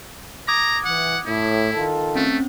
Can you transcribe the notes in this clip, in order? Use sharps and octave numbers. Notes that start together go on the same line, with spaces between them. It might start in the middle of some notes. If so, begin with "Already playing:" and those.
A#5 D6 D#6 G#6
E3 F#5
A2 E4
D#3 F4 A4
A3 C4 C#4